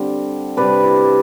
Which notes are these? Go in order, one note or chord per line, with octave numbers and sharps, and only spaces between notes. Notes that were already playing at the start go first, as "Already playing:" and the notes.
Already playing: D3 G3 C4
C3 G3 D4 B4 D5
E4